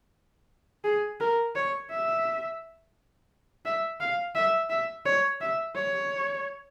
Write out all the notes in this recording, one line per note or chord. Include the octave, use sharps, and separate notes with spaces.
G#4
A#4
C#5
E5
E5
F5
E5
E5
C#5
E5
C#5